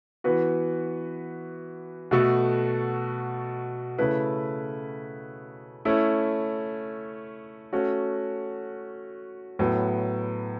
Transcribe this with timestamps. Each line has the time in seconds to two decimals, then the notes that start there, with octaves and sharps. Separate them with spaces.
0.24 E3 B3 F#4 B4
2.11 B2 A3 F#4 A4
3.98 C#3 A3 E4 B4
5.85 A3 C#4 E4
7.73 A3 C#4 F#4
9.59 A2 F#3 B3